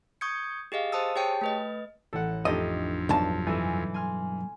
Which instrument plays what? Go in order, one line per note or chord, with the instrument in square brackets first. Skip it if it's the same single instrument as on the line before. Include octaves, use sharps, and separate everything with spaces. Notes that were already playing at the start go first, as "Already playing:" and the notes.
[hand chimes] C#6 D#6 G6 G#6 C#7
G4 G#4 D#5 F5
C5 A5 D#6 E6
G4 G#4 C#5 G5 A5
A3 B4 D#5
[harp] A1 [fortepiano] A4 F#5
[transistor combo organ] F2 [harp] A3 D4 D#4 [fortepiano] G4 A4 [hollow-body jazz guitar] D#5
[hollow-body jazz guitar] B1 G2 A5 [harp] D#5
[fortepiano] E3 [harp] A4 G#5
[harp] G#5 C6 F6